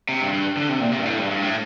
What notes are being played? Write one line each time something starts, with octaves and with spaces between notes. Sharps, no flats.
C3
G2
G2
D3
C3
A#2
C3
G2
A2
G2
G2
A2